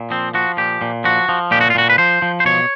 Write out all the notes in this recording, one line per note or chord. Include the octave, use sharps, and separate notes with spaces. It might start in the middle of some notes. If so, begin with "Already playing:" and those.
Already playing: A#2
F3 C4
F3 F#4
A#2 G4
A#2
F3 F#4
F3
A#2 G4
F#4
F4
A#2 F#4
B4
F3 C5
F3
C5
B2 C#5